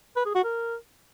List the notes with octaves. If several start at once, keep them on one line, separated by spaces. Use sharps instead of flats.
B4
G#4
F#4
A#4